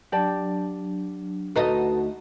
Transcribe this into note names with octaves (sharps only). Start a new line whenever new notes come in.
F#3 D4 G4 D5 A5
D2 D#4 F#4 A4 B4 D#5